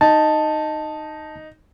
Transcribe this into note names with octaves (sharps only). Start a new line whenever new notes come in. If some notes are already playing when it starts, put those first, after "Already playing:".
D#4 A5